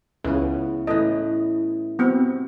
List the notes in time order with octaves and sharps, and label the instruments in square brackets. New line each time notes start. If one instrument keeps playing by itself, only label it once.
[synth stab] C#2 C#3 [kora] E3 B3 C#4
[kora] A2 E3 [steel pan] D#5
[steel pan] B3 C4